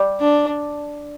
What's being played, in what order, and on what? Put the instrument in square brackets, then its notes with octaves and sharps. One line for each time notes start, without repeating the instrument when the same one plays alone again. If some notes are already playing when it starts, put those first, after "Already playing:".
Already playing: [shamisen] G3
[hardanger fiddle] D4